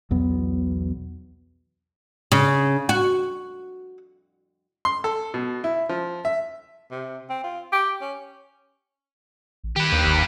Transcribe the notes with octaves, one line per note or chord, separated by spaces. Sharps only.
B1 E2 F#3 B3
C#3
F#4
C6
A4
B2
E4
F3
E5
C3
C4
F4
G4
C#4
A1
D#3 G4 B4
D#2
G1